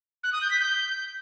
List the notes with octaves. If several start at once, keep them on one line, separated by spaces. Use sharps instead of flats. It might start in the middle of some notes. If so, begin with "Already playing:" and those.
F#6
D#6
G6
B6
G6